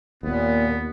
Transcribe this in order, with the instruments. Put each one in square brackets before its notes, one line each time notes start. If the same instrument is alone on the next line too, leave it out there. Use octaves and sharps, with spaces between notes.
[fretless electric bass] D#2 [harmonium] A#2 [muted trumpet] B3